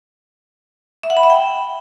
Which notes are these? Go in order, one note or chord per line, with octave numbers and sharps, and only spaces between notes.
E5
F#5
B5
E5
G5